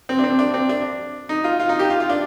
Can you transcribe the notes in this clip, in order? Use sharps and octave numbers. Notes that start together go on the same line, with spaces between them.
C4
D4
C4
D4
C4
D4
D#4
F4
F4
D#4
G4
F4
F4
D4